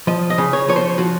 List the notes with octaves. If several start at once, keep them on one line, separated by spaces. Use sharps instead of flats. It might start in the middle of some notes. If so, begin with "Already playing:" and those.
F3 D#5
D#5
C#3
C#5
F3 C#5
C5
F3 F#4